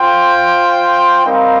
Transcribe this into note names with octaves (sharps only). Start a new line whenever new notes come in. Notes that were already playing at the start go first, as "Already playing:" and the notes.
Already playing: F4 C5 G5
G3 C4 D#4 A#4 F5